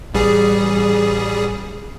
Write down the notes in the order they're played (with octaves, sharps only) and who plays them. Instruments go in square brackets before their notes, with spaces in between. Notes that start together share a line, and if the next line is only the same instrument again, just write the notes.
[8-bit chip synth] A1 G3 G#4